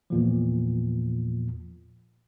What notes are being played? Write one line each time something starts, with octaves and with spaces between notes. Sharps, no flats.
E2 A#2 F3